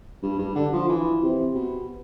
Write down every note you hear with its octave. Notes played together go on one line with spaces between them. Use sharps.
G2
G2
D3
F3
E3
C3
B2